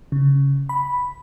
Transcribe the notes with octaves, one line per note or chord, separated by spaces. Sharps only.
C#3
B5